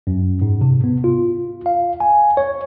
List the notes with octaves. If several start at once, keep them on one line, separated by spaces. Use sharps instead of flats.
F#2
G#2
C3
B3
F4
F5
G#5
C#5